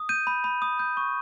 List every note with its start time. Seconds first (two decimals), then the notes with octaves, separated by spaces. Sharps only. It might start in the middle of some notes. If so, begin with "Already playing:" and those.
Already playing: D#6
0.09 G6 D#7
0.27 B5
0.44 B5
0.62 D#6
0.79 G6
0.97 C#6